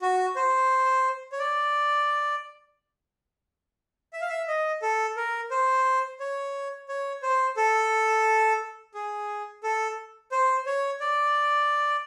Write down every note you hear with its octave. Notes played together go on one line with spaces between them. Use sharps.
F#4
C5
C#5
D5
E5
F5
E5
D#5
A4
A#4
C5
C#5
C#5
C5
A4
G#4
A4
C5
C#5
D5